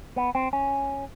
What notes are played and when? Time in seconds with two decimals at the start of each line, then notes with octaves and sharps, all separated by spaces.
0.16 B3
0.35 C4
0.53 C#4